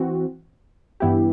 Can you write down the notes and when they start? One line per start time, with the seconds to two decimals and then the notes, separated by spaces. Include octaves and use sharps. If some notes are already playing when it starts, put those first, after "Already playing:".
Already playing: E3 C4 F#4
1.00 G2 E3 B3 E4 G4